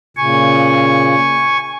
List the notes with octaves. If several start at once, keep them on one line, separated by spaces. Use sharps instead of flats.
A#2 C#3 G#5 C#6